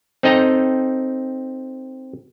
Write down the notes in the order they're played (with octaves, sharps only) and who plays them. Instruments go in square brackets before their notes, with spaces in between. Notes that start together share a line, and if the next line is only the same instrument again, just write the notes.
[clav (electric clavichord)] C4 D#4 A4 D#5 G5 A#5